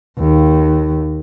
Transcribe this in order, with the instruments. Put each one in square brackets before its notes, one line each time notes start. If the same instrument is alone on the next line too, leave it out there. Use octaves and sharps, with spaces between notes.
[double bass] D#2